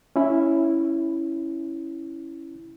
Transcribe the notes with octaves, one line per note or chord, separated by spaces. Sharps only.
C#4 E4